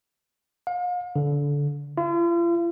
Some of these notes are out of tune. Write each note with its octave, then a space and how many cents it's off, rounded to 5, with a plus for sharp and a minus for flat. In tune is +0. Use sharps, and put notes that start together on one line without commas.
F5 +40
D3 -25
F4 -45